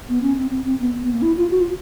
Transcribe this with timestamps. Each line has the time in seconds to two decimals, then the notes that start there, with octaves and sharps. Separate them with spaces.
0.09 B3
0.22 C#4
0.37 C4
0.51 C4
0.65 C4
0.80 B3
1.04 B3
1.13 A#3
1.22 E4
1.37 F4
1.51 F#4
1.60 F4